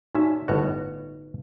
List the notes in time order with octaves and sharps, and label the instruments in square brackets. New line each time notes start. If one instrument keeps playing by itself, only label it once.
[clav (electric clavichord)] A#2 C#4 E5 [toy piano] D#4 F#4
[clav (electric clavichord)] G1 A2 F#4 [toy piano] B4 D#5